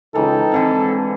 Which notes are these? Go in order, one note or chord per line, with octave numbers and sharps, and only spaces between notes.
C#2 D#3 E3 D#4 A4 G5
G#2 D3 E3 C4